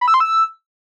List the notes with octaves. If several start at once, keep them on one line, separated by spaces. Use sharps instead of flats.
B5
E6
C6
E6